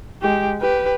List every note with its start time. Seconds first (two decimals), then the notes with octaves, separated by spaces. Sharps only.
0.22 G#3 G4
0.61 G4 B4